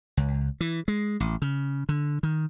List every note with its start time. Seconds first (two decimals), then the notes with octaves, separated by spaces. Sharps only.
0.17 C#2
0.61 E3
0.88 G#3
1.20 A1
1.42 C#3
1.89 D3
2.23 D#3